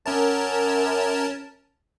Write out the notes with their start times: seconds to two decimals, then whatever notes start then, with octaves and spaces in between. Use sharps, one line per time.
0.06 F#2 C#4 A#4 A5